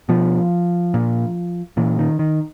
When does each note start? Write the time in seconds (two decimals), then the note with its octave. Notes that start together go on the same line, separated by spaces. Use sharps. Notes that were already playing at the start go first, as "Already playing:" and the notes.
0.09 B2 F3
0.94 A#2
1.77 A#2 E3
1.99 D#3
2.19 D#3